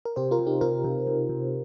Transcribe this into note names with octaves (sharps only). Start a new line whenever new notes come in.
A#4
C3 G4 C5
F4 A#4
C3
D#4 G4
C3 F4 A#4
C3
C3
C3